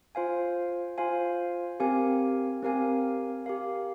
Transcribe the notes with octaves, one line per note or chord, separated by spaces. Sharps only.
F4 C5 F5 G#5
F4 C5 F5 G#5
C4 G4 A#4 F5 G#5
C4 G4 A#4 F5 G#5
G4 A#4 F5